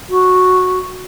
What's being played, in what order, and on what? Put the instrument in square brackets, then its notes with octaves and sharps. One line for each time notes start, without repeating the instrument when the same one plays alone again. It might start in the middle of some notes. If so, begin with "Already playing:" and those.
[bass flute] F#4